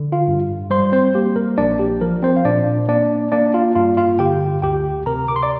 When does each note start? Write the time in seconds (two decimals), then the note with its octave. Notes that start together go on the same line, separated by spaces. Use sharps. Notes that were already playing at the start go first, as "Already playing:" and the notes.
Already playing: D3
0.12 F4 F5
0.28 G2
0.70 G3 C5 C6
0.92 C4 C5
1.15 A#3 G4
1.36 A#4
1.58 A#1 D4 D5
1.79 G4
2.01 F3 A#4
2.23 C4 C5
2.36 F5
2.45 A#2 D4 D5
2.88 A#3 D4 D5
3.32 A#3 D4 D5
3.54 F4 F5
3.75 G2 F4 F5
3.97 F4 F5
4.19 D3 G4 G5
4.62 D2 G4 G5
5.06 C3 A#4 A#5
5.28 D6
5.36 C6
5.43 D5 D6